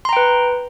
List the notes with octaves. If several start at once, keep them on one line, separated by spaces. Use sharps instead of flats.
B4 G5 A#5 C6